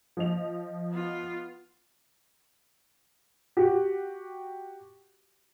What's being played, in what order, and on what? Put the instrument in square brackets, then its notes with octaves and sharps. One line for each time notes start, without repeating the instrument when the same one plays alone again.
[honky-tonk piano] F3 D#5 F7
[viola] B3 F4
[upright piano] F#4 G4